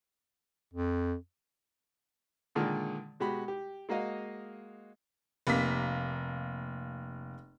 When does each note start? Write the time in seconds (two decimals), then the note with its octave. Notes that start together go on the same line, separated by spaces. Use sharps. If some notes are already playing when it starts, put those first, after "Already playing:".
0.74 F2
2.55 A#2 D3 D#3 G#3
3.20 B2 G#3 F#4 G4 B5
3.48 G4
3.89 G#3 A#3 F#4 D#5 F5
5.47 F1 A#3 B6